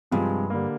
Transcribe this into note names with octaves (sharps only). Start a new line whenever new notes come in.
G2 C3 F3 G#3
D3 G3 A#3